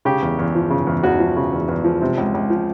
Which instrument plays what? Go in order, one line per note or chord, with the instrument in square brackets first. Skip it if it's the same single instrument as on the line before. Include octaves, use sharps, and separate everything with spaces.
[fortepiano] C#3 G4
E2
E2
F3
C#3
E2
E2 F#4
F3
C#3
E2
E2
F3
C3
C#2
C#2
F3